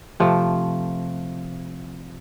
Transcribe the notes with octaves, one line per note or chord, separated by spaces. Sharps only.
C3 F3 A3